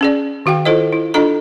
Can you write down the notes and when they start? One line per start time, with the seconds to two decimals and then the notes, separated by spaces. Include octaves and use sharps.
0.01 C#4 G#4 D5
0.46 D#3 F#4 F5 G5
0.65 E4 F4 A4 C5 D#5
0.93 E4
1.14 D4 F4 A4 D#5 A#5